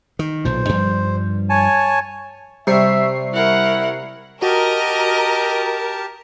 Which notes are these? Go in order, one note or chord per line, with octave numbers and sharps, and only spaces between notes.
D#3
B1 A#2 C5
G2 F3 G3
C#5 G#5 A5
C3 G3 E5 C#6 C7
E4 A#4 F#5
F#4 G4 A#4 D#5 A5